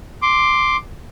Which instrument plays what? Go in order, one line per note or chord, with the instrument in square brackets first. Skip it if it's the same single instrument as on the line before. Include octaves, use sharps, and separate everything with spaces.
[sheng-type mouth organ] C6 D6